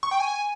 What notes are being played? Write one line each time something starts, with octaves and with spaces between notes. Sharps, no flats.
C#6
G5
G#5